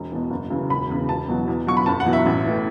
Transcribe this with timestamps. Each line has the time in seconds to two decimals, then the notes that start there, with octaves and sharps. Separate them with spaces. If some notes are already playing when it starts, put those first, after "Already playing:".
Already playing: E1
0.12 E2 B2
0.30 F#1
0.50 F#2 C#3 E3
0.69 E1 B5
0.90 E2 C#3
1.09 E1 A5
1.28 E2 B2 F#3
1.48 E2
1.67 B2 F#3 C#6
1.77 B5
1.86 F#1 A5
2.00 F#5
2.06 E2 B2 F#3
2.13 E5
2.26 A1
2.45 A2 E3